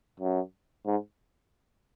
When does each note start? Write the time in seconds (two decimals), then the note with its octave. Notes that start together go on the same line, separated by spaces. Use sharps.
0.20 F#2
0.86 G#2